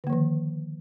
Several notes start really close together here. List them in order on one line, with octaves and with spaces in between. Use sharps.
D3 A#3 F3 D#3